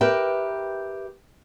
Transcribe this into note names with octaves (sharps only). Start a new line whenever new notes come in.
G4 A#4 B4 E5 G5